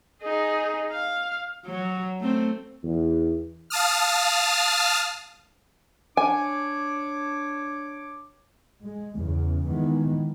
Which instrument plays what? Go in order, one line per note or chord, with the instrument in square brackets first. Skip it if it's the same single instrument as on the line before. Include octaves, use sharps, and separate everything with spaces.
[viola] D#4 G#4
F5
[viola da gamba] F#3
A3 C4
[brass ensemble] E2
[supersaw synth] F5 A5 D#6 F6
[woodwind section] D4 C#5 D6 [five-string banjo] G#5
[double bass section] G#3
E2 C#3
D#3 E3 G#3 B3